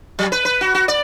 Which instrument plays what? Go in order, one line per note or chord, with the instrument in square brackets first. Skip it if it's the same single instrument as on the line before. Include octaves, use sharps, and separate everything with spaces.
[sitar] F#3
B4
B4
F#4
F#4
D5